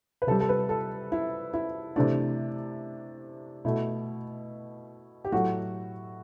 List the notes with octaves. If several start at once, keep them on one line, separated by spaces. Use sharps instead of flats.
B4
C3 G3 A4
A4
B4
A4
E4
E4
C3 E3 A3 D4
B2 A3 E4
G4
A2 F#3 A3 F#4